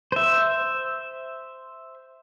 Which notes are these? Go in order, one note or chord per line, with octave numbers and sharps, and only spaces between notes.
C5 E5